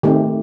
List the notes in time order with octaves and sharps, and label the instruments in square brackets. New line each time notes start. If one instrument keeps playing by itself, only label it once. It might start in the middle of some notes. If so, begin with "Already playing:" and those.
[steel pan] D#3 A3 C4 G4